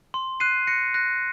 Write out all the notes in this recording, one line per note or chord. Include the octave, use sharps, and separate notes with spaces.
C6
F#6 C7 D#7
F#6 A#6 C#7
F#6 A#6